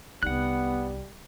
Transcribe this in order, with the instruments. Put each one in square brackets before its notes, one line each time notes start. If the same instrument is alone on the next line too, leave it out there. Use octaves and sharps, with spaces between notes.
[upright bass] C2 D#4 [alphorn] G3 [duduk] B3 [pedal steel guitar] F#5 F#6